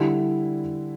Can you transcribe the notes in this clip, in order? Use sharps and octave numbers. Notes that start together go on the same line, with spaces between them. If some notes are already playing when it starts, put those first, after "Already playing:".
Already playing: D3 G3 E4